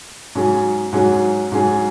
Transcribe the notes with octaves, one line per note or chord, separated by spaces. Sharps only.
G#2 F#3 C#4 G#4
G#2 F#3 C#4 G#4
G#2 F#3 C#4 G#4